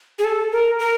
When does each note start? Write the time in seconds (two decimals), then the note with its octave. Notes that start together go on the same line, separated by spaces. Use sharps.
0.19 G#4
0.24 A4
0.52 A#4
0.79 A#4